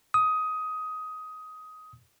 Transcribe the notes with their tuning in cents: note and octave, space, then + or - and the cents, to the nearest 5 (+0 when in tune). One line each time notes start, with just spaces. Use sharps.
D#6 +15